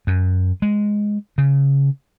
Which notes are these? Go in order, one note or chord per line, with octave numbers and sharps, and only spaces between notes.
F#2
G#3
C#3